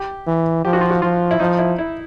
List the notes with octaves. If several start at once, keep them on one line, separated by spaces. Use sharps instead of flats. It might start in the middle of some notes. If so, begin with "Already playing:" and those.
Already playing: G4
E3
F3 G4
F#4
F4
F#4
F3 F4
E4
F3 D#4
E4
E4